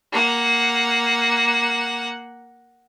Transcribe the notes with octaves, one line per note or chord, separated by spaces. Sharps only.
A#3 F#5